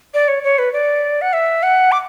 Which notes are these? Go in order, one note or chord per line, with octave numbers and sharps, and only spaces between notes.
D5
C#5
C#5
B4
D5
F#5
E5
F#5
D6